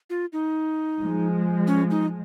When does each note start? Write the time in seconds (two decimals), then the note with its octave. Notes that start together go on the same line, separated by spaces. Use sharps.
0.10 F4
0.33 D#4
1.00 F3 G#3
1.67 C#4
1.91 D#4